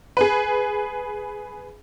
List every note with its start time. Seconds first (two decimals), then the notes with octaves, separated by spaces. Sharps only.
0.17 G#4 B4